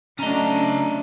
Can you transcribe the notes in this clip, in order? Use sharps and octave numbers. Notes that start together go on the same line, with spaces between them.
C#3 F#3 A3 C#4 D4 D#5 A#5